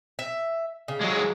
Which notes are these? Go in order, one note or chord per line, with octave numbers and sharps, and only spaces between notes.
E5
C#3
F#3 G#3